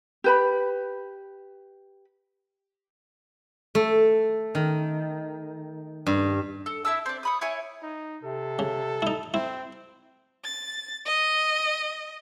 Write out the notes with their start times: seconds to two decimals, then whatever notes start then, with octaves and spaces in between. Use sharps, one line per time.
0.24 G4 B4 B5
3.75 A3
4.55 D#3
6.07 G2
6.66 A4
6.85 E4 E5 A5 E6
7.06 C4 D4
7.23 C#5 B5 D#6
7.41 E4 C#5 G#5
7.83 D#4
8.24 C3 A4
8.59 C#3
9.02 D#4 E4
9.34 C4 E4
10.44 A6
11.06 D#5